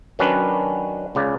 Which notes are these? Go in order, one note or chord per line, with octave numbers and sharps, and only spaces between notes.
D#3 F#3 C#4 D4 B4
C#2 C#3 D5